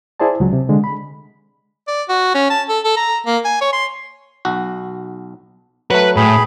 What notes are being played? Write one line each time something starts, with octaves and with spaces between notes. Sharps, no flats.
E4 G#4 C5 D5 A5
C#2 F#3
C3
D3 G#3
B5
D5
F#4
C#4
A5
A4
A4
A#5
A#3
G#5
C#5
C6
B1 F#4
F#3 A3 B4
A2 G#4 B5